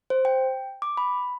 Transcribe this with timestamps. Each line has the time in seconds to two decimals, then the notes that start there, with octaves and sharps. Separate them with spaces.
0.10 C5
0.25 G5
0.82 D6
0.97 B5